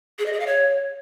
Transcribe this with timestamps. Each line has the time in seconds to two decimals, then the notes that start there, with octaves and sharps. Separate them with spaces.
0.19 G#4
0.26 D#5
0.33 G#4
0.40 F5
0.47 C#5